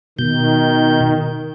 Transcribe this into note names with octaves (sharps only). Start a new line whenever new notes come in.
B2 D#3 G6